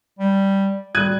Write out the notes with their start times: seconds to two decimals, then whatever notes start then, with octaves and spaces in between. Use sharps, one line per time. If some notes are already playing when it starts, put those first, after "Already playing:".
0.19 G3
0.95 G3 F#6 G#6 D#7